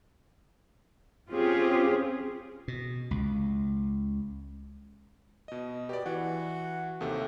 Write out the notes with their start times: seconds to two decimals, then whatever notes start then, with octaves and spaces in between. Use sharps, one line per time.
1.31 C4 C#4 F4 G4 G#4
2.68 B2
3.11 C#2
5.48 B2 D#5
5.89 B2 G4 D5
6.06 E3 F#4
7.01 D#2 C3 A3